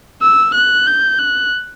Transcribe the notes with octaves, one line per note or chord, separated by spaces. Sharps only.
E6
F#6
G6
F#6